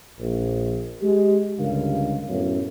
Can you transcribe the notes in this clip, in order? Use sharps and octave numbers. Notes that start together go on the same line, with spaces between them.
A#1
G#3 G4
C#2 G2 D3 A#4 F5
F#2 A2 A3 B3 C#4